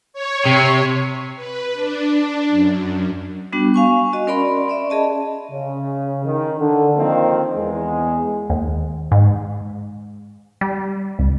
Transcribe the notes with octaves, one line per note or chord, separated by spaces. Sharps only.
C#5
C3
B4
D4
F#2
G3 B3 D4 F#4
F5 G#5 C#6
F#4 D#5
C#4 A#4 D5 B5 C6
C#4 D5 E5
G#4 D#5 A5
C#3
D#3
D3
D#3 F3 A#3 C4
E2 G#3
D#2
G#2
G3
C#2